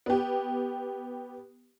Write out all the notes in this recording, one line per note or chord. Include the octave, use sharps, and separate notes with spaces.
B3 G4